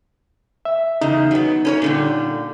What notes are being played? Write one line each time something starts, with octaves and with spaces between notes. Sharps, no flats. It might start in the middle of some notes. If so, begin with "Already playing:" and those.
E5
E2 C#3 D#4
F#3 B3
C#4 B4 C#5
A#2 D3 G3